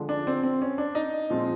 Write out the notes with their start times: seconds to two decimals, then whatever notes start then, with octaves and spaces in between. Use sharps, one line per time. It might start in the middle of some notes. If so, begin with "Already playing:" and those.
Already playing: D3 F3 G#3
0.09 D4
0.27 C4
0.43 C4
0.62 C#4
0.78 D4
0.95 D#4
1.30 A#2 F3 G#3 C4